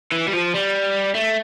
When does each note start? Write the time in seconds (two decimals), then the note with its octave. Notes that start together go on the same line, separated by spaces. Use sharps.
0.12 E3
0.28 G3
0.33 F3
0.54 G3
1.15 A3